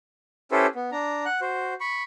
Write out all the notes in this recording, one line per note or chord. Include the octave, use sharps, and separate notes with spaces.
C#4 E4 G4 A4 B4 C5
B3
D4 A#5
F#5 F#6
F#4 C5
B5 C#6